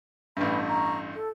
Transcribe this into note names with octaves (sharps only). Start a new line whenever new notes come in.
A1 G2 B4 G5 B5
A#5 C#6
A4